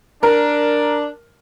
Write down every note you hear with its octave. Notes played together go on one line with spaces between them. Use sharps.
D4 A#4